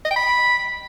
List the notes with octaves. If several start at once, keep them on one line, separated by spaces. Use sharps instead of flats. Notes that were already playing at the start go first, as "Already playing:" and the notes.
D#5
G5
B5